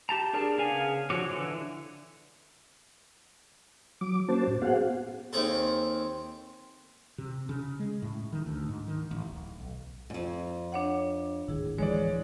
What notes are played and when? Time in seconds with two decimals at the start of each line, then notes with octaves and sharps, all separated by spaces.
0.09 G4 A5 A#5
0.33 D4 G#4 A#4 D5 A5
0.58 C#3 B3 G#4 F5 G#5
1.10 D3 F3 F#4 C#5 D6
1.32 D3 E3
4.01 F#3 D6
4.28 A#3 C#4 F#4 C5 A5
4.47 A2
4.62 B3 F#4 G#4 C5 F5 F#5
5.33 D#2 D#3 C4 G#4 A4
7.18 C3
7.49 C#3
7.79 G#3
8.02 A2
8.32 D#3
8.46 D2
8.69 G#2
8.88 D#3
9.11 A1
9.27 D1
9.60 B1
10.10 F2 G#2
10.72 D4 C#5 F#5
11.48 D1 G#1 D#3 E4 G#4
11.78 D1 E3 F3 G#3 C#5 D5